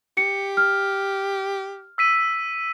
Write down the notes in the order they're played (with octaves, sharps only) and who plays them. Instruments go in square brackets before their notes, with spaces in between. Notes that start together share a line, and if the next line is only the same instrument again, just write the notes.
[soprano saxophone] G4 [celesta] C#7
[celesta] F6
[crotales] E6 B6 D#7